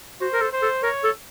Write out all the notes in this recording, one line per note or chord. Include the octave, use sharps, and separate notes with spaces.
F#4 C5
A#4
A4
C5
A4
A#4 C#5
A4